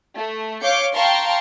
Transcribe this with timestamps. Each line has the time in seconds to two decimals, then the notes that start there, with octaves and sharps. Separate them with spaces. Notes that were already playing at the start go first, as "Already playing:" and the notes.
0.16 A3
0.62 C#5 F5 D6 G6 C#7
0.94 F5 G5 A5 A#5 C6 C#6